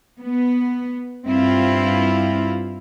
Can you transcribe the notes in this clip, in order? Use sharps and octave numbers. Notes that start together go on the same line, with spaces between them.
B3
G2 C4 E4 F4